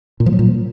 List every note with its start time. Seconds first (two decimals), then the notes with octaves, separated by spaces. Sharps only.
0.20 A#2
0.26 F3
0.33 F#3
0.39 A#2